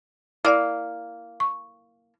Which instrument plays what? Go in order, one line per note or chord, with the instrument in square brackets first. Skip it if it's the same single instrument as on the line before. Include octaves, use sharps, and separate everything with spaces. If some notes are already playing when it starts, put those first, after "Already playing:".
[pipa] A#3 [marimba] E4 D5 F5
[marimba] C#6